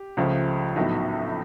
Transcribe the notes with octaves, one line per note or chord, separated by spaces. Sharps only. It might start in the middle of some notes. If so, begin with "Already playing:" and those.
Already playing: G4
C#2 C#3 F3 A3
A#1 A2 F#3 B3 D#4